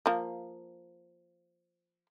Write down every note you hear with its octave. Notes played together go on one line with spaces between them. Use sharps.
F3 A#3